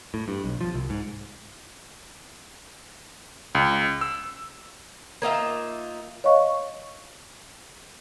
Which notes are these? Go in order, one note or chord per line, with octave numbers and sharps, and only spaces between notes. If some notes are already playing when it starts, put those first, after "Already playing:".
A2
G2
B1
F3
C2
G#2
C#2
E6
A#3 D#4 F4 E5
C#5 D#5 F5 C#6